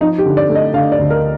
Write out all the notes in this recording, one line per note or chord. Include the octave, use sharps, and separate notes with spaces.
F3 D#4
G4
D3
D5
A3
D#5
D3 F5
D5
D2
A#4